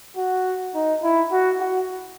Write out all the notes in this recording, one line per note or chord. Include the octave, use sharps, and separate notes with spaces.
F#4
D#4
E4
F#4
F#4